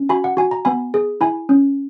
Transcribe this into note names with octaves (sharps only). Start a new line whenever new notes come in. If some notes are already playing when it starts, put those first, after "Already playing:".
Already playing: C#4
F#4 G#5 B5
F#5
F#4 G#5
A#5
B3 G#5 B5
G#4
E4 G#5 B5
C#4